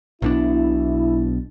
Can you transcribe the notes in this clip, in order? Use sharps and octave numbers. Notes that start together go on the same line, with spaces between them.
B1 B2 D4 E4